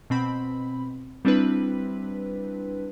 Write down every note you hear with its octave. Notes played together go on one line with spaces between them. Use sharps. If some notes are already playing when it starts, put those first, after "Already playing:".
B2 C4 B5
G3 C4 D4 E4 B4